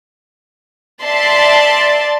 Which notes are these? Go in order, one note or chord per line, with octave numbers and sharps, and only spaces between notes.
D5 E5 A5 C6